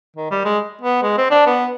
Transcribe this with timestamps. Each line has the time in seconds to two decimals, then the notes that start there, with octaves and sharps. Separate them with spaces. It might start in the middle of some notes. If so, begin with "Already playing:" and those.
0.17 D#3
0.31 G3
0.45 G#3
0.82 B3
1.03 G#3
1.18 C4
1.31 D4
1.46 B3